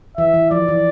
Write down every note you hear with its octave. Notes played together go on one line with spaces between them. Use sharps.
E3 E5
E3
F3 D5
E3